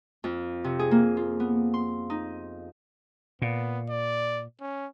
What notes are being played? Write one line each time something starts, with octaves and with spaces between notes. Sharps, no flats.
F2
C3
G#4
A#3
F4
B3
C6
D#4
A#2 B3
D5
C#4